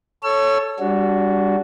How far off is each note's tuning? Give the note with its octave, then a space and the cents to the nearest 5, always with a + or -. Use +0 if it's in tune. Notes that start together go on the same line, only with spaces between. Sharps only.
A4 -5 C#5 +0 E6 +40
G3 +20 D4 -25 F#4 +0